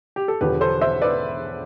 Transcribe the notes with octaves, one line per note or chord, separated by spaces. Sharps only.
G4
A4
E1 E2 D3 F3 G4 B4
A4 C5
C5 E5
B4 D5